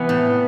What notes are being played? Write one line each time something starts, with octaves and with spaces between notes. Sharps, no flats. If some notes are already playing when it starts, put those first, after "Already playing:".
Already playing: C3 E3 B3
A2